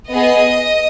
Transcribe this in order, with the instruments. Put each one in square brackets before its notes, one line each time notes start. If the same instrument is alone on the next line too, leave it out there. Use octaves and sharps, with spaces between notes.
[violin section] B3 G#4 D#5